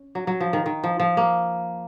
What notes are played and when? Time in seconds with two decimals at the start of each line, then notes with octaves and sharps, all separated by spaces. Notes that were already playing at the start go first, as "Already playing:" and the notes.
Already playing: C#4
0.15 F#3
0.27 F#3
0.40 F3
0.53 D#3
0.66 D#3
0.84 F3
1.00 F3
1.17 A#3